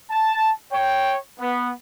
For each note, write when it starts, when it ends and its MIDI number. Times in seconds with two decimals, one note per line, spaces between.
0.11 0.50 81
0.71 1.15 73
0.71 1.15 79
1.39 1.71 59